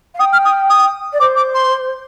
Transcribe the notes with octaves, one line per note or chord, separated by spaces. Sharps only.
F5
G5 D#6
F6
D#6
D#6
D5
C5 D6
D6
C6